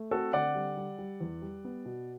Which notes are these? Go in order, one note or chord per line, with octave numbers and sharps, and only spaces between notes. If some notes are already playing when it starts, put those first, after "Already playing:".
Already playing: A3
C4 F#4 A4
D3 D5 F#5
G3
G3
G3
E2
G3
B3
B2